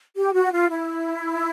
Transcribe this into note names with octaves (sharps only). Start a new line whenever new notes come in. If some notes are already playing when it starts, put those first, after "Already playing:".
G4
F#4
F4
E4